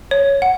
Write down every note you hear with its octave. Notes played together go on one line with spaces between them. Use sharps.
C#5
F#5